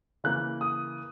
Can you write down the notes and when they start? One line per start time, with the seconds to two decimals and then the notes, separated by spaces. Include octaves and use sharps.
0.24 C#3 E3 A#3 F#6
0.61 D#6